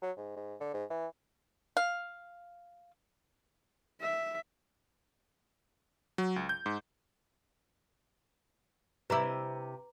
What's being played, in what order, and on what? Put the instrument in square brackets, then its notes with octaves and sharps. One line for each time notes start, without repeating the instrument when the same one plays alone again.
[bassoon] F#3
G#2
G#2
D3
G#2
E3
[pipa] F5
[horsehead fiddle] E5
[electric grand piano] F#3
C#2
G6
G#2
[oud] C3 E4 [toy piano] B4 A#5 D6